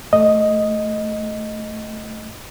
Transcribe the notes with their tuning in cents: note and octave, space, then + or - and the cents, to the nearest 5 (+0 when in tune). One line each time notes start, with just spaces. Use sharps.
A3 +0 D#5 +0